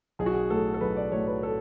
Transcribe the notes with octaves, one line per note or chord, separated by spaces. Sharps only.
B1 G#4
F#4
G#4
A2 F#3 A3 A4
A4
B1 B4
D5
A2 F#3 A3 C#5
B4
A4